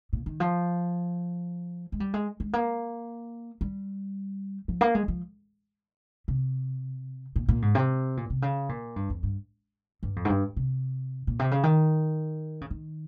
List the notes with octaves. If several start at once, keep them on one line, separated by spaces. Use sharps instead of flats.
A#2
D#3
F3
G#3
G3
G#3
G#3
A#3
G3
F3
A#3
G#3
F3
C3
A#2
A#2
G#2
C3
A#2
C3
C#3
A#2
G2
F2
G2
G2
F2
G#2
G2
C3
A#2
C3
C#3
D#3
C#3
D#3